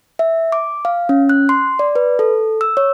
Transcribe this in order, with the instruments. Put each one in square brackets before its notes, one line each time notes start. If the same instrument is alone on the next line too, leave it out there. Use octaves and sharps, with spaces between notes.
[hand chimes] E5
D6
F5
C#4
F#6
C6
D5
B4
A4
E6
C#5